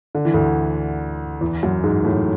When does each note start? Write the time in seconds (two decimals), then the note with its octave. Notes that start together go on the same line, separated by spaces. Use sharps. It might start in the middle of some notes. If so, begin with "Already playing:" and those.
0.15 D3
0.25 E3
0.34 D2 D3
1.41 E2 E3
1.63 F#2 F#3
1.84 G#2 G#3
2.04 A2 A3